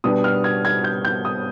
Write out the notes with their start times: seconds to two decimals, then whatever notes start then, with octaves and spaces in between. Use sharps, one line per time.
0.04 B2 G3 B3 D4 D#6
0.24 F6
0.44 G#6
0.65 G#6
0.84 G6
1.05 G6
1.25 D#6